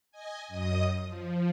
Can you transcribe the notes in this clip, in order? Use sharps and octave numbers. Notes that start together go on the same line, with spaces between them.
D#5 G#5
F#2 D#5 D#6
F3